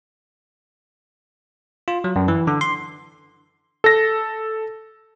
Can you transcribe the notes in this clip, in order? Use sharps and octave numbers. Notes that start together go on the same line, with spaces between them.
F4
F#3
F#2
E3
D3
C6
A4 A#6